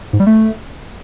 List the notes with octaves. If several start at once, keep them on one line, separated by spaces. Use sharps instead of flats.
G#2
G3
A3